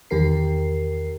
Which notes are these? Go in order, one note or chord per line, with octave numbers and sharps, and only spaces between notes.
E2 D#3 G4 A#4 C7